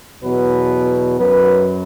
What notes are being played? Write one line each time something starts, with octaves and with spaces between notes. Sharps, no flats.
E2 B2 F#3 B4
F#2 F#3 B4